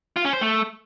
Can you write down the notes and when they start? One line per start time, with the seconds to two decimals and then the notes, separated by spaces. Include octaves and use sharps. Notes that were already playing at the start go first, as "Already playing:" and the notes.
0.16 F4
0.25 C#4
0.33 C5
0.41 A3